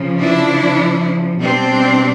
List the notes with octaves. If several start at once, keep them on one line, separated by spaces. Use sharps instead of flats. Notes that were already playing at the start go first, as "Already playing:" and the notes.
Already playing: C#3 F3
D4 E4
B2 G3 C4 D4